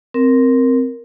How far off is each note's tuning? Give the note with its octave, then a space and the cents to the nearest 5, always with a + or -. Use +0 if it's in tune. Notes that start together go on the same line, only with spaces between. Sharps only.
C4 +0 A#4 +0